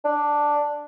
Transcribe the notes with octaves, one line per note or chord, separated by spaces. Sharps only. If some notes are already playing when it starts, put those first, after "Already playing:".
D4